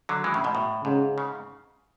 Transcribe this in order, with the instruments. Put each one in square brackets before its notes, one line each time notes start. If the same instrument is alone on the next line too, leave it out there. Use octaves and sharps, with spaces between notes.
[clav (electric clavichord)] D3 F#3
E3 G#3
A2 C#3
G#2 B2
A2
[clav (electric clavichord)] G#2 [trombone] C#3
[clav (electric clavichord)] C#3